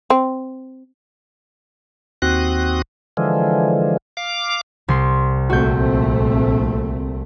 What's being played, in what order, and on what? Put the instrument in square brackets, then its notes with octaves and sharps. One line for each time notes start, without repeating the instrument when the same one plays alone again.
[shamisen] C4
[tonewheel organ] D#2 C4 F#4 D#6 F#6
D3 E3 F3 G#3
F5 D6
[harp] C2 C6
[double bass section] A#1 A3 C4 [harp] F#4 G6